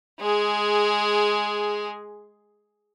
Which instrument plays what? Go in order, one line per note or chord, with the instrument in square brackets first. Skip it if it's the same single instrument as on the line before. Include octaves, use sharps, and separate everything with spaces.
[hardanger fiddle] G#3 G#4